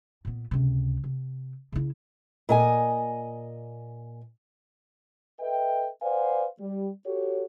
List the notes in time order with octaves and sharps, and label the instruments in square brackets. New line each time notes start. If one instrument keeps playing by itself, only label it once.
[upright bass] A#2 B3
C#2 C3
C3
C#3 E4
[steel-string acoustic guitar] A#2 D#5 G#5
[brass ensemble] A4 B4 D#5 E5 G5
B4 C5 D5 F5 F#5 G#5
G3
F#4 G4 A4 C#5